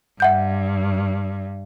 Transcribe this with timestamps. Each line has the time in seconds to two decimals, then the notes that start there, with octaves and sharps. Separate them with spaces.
0.20 G2 E5 F#5 G6